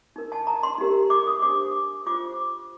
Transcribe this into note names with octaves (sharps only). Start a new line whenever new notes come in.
D#4 A#4
A5
A#5
C6
D#4 G4 A#4
D6
D#6
D4 G4 C5 D6
F4 C5 D6